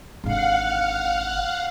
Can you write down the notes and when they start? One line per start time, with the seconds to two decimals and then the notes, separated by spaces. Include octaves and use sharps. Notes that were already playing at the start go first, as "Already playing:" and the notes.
0.24 G#1 D3 F5 F#5